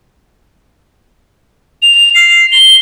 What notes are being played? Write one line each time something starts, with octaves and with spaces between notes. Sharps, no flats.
F7
C7
G7